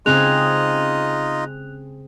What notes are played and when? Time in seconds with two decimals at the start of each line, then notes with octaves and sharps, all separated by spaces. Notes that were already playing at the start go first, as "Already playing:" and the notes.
0.06 C#3 C4 D#4 F4 G#4 D#5 F#6 F7